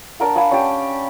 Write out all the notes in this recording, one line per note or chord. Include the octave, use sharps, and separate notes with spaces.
D4 A#4 F#5
F5 F#5 G#5 B5
C#4 D4 G4